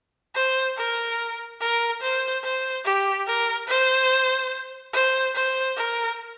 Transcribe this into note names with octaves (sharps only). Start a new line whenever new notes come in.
C5
A#4
A#4
C5
C5
G4
A#4
C5
C5
C5
A#4